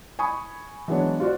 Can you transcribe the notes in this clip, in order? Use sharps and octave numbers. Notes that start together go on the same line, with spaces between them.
G#5 B5 C#6 D#6
E3 F#3 G#3 B3 D4 C#5
F4 F#4 C5 D5